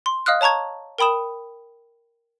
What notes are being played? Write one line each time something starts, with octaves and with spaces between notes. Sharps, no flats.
C6
D#5 F5 D#6 F6 F#6
C#5 A5 A#5 C#6 G#6
A#4 G5 B5 D#6 E7